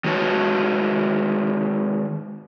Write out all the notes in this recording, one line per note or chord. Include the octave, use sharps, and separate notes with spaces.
D#3 G#3 F#4 B4 C#5 A5